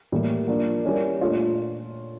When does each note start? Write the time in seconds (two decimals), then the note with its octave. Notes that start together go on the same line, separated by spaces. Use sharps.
0.12 A2 E3 G3 A#3
0.48 F3 A#3 D4
0.85 G3 C#4 E4 A#4 D5
1.21 A#2 A3 D4 F4 C#5